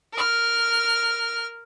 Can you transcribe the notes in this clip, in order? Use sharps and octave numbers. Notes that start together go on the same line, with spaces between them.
A#4 F6